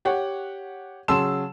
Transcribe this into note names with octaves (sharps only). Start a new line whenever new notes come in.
G4 C#5 F#5
C#3 F#3 A5 C6 E6 E7